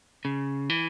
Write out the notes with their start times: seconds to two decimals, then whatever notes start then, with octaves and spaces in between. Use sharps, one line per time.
0.25 C#3
0.70 E3